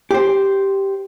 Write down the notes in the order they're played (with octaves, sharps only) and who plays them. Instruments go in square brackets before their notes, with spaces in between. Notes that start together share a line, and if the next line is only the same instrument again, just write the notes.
[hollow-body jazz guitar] G4 C5